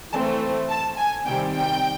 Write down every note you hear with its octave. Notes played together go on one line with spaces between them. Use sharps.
E3 A3 C4 A5
A5
G#5
C3 D#3 G3 C4 G5
G5